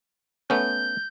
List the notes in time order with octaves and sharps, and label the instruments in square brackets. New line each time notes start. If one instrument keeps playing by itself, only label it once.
[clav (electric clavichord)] A3 B3 C#4 [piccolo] G6